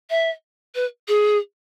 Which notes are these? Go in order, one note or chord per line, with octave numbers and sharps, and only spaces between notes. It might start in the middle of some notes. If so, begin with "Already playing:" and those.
E5
B4
G#4